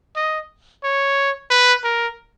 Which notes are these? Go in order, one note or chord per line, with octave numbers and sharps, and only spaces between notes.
D#5
C#5
B4
A#4